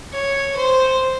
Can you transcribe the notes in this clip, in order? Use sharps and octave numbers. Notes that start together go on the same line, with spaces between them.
C#5
C5